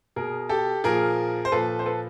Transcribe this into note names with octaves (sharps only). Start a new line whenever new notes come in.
B2 G#4 A#4
G4 A4
A#2 F3 G#4 A#4
C5
A#2 F3 A4 B4
C5
A4 B4